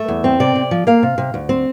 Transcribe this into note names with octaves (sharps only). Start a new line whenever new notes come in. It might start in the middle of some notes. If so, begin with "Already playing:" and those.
Already playing: A3 E5
E2
C4
C3 D5
C3
F3
A#3 F5
C3
C3
D2
C4